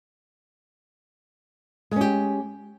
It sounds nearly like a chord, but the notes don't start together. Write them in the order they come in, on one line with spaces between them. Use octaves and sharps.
G#3 C#4 G4